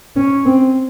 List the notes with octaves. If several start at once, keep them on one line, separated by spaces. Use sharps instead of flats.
C#4
C4